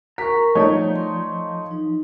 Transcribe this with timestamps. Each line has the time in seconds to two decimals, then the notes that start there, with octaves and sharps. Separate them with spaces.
0.18 A#4 A#5 C#6 B6
0.55 F3 G3 A3 D#4 C#5 D5
0.96 C6
1.71 D#4